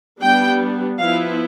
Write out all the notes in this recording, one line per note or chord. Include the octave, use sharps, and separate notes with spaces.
G3 B3 D4 G5
F3 B3 E4 F5